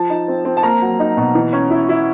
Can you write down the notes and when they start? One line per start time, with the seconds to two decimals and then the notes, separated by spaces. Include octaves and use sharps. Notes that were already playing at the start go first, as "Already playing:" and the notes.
Already playing: F3 A5
0.10 D#4
0.28 C4
0.45 C4
0.57 A5
0.63 A#3 A#5
0.81 F#3
1.00 D#4
1.17 B2
1.35 E3
1.53 C#4
1.70 E4
1.89 E4